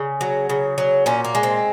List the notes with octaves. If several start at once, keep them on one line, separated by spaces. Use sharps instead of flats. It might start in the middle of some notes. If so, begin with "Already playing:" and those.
Already playing: C#3
F#3
C#3
F#3
A#2 C#4
A#3
G#3
C4